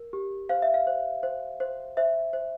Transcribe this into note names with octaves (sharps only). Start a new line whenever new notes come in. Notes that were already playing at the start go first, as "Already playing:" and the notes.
Already playing: A#4
G4
C5 F5
E5
F5
C5
C5
C5
C5 E5
C5